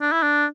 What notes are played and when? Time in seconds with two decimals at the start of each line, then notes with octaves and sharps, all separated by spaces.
0.01 D4
0.12 E4
0.22 D4